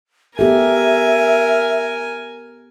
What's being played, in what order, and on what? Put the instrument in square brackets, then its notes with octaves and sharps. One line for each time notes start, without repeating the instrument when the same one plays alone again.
[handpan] B3 G4 A4 [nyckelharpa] A#4 G#5 [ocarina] E5